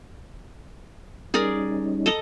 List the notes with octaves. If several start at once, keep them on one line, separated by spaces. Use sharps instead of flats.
G3 C#4 D#4 G#4 A#4 D5
A4 D#5 A#5